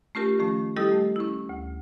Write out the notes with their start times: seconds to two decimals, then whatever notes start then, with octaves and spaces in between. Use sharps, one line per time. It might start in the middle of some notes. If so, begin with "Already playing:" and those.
0.15 A3 C#4 F4 G4 A#4
0.39 D#3 F3 A3 C#4
0.76 G3 E4 G4 A4 D#5 D#6
0.92 A3
1.16 C#4 E4
1.49 D2